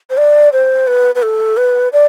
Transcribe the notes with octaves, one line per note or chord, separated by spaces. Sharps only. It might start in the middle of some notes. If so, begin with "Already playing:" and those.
C5
D5
C5
B4
B4
A4
B4
D5